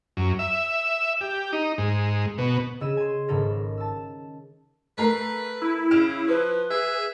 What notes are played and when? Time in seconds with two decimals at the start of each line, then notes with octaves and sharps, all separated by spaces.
0.17 F#2
0.39 E5
1.21 G4
1.53 D#4
1.78 G#2
2.38 B2
2.80 C#3 G#4 D#5 E6 D#7 E7
2.97 G#5 C6
3.28 G#1 G#2 C#3 A4 A#4 A#6
3.77 A5 E6
4.98 A3 A#4 B4 C7
5.62 E4
5.91 C#3 F6 D7 E7
6.28 F3 B4
6.70 G#4 E5